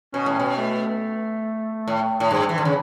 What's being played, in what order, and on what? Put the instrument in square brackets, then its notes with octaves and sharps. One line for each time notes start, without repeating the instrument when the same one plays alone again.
[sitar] B2 [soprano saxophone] C#4
[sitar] A2
B2
[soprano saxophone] A3
[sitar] A2
A2
G2
E3
D3
C#3